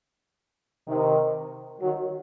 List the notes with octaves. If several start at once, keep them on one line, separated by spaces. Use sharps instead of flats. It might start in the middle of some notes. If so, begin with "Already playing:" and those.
C3 D#3
D#3 F#3